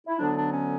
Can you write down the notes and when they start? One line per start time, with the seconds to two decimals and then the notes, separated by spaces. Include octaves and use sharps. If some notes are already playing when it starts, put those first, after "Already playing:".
0.07 E4
0.19 D2 D3 F#3 B3 D4
0.35 D4
0.50 C#4